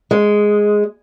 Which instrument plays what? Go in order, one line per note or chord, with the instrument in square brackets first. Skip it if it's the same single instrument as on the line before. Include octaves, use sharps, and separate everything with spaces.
[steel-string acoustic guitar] G#3